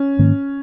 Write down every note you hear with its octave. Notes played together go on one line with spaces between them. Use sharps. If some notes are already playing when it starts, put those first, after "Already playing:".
Already playing: C#4
G#2 D#3 A#3